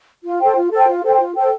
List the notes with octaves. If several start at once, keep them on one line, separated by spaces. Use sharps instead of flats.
F4
A4 C5 G5
F4
A4 C5 G5
F4
A4 C5 G5
F4
A4 C5 G5